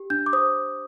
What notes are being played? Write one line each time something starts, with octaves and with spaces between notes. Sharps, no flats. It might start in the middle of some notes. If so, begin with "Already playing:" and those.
Already playing: G4
D4 G6
D6
C5 D#6